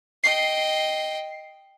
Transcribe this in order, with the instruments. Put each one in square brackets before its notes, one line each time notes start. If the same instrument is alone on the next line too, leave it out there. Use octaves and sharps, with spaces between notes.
[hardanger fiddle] D#5 G5 [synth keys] C7